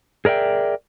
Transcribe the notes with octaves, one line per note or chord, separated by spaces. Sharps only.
G#4 A#4 D5 E5 G5